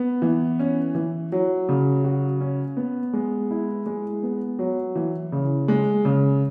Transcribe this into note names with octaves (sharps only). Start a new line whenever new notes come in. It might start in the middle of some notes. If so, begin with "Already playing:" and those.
Already playing: B3
E3
C#4
E3
F#3
C#3
F#4
C#4
B3
G#3
E4
G#3
B3
F#3
E3
C#3
G#3
C#3